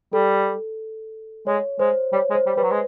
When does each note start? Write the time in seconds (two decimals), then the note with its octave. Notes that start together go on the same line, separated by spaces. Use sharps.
0.13 G3 A4
1.47 G#3 C#5
1.79 G#3 C5
2.13 G3 C#5
2.30 G#3
2.35 C5
2.46 G3
2.57 G3 B4
2.63 F#3
2.71 G#3